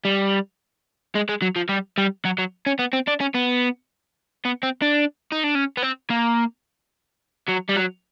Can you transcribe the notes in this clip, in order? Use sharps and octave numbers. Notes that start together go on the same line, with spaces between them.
G3
G#3
G#3
F#3
F3
G3
G3
F#3
F#3
C#4
B3
C4
D4
C#4
B3
B3
C4
D4
D#4
D4
C#4
B3
C4
A#3
F#3
G3
F#3